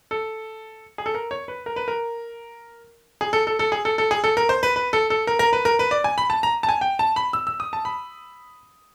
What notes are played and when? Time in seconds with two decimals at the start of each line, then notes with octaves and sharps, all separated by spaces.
0.11 A4
0.98 G#4
1.06 A4
1.15 A#4
1.31 C#5
1.48 B4
1.66 A#4
1.76 B4
1.88 A#4
3.21 G#4
3.33 A4
3.47 A4
3.59 A4
3.72 G#4
3.85 A4
3.98 A4
4.11 G#4
4.24 A4
4.37 A#4
4.49 C5
4.63 B4
4.76 B4
4.93 A4
5.10 A4
5.27 A#4
5.39 A#4
5.53 B4
5.65 A#4
5.79 B4
5.91 D5
6.04 G#5
6.18 B5
6.30 A5
6.43 A#5
6.63 A5
6.69 G#5
6.81 G5
6.99 A5
7.16 B5
7.33 E6
7.47 E6
7.60 D#6
7.73 A5
7.85 B5